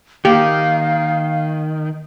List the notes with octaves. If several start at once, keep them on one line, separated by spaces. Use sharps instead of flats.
D#3 A#3 G4 F5